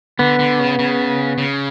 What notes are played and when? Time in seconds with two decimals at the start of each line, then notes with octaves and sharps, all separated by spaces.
0.19 D3 B3
0.39 D3
0.59 C#3
0.79 C#3
1.38 C#3